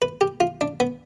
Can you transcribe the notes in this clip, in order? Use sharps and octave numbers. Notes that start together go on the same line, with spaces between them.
B4
G4
F4
D4
B3